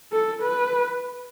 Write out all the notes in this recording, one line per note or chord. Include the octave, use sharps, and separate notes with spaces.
A4
B4